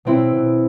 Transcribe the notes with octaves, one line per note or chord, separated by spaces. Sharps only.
B2 C4 E4
B2